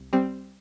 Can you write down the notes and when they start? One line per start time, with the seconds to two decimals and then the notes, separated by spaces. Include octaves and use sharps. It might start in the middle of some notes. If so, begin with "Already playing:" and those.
Already playing: C2
0.13 G3 C4